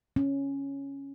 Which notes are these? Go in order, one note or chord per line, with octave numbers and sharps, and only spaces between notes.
C#4